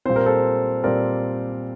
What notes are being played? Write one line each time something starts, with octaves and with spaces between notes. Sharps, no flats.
A#2 G3 C4 C5
A#4
A4 C5
A#2 G3 C4 A#4 D5